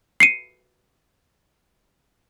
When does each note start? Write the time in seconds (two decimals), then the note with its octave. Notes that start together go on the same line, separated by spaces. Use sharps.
0.20 C7 C#7 D#7